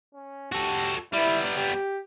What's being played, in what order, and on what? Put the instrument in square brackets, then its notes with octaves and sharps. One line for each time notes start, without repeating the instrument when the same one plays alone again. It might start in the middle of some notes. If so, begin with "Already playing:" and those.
[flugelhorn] C#4
[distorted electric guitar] F#4 A4 [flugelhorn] G4
[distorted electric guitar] G3 B3 [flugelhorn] E4
[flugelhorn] G4